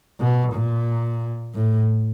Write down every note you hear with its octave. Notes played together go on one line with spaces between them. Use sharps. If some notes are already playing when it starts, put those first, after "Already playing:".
B2
A#2
A2